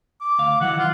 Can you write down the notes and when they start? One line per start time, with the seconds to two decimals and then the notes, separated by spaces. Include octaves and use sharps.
0.21 D6
0.39 D2 F5
0.61 D#3 E3 F#3 F#5
0.79 F4